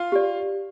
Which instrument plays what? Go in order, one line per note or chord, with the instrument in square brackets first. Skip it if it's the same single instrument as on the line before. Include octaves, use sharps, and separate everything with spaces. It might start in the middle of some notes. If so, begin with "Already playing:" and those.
Already playing: [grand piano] F4 F5
[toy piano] G4 D5